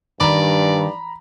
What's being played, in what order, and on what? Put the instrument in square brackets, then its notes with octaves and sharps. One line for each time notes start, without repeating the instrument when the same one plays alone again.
[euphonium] G2 [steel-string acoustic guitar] D#3 [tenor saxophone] D5 [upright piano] A#5 B5